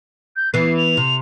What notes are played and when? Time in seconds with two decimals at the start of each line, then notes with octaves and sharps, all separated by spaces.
0.36 G6
0.54 E3 B3 C7
0.77 F7
0.97 C3